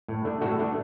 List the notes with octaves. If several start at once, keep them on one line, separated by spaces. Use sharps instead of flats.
A2
A3 D4
A2 F#4 A4
A3 D4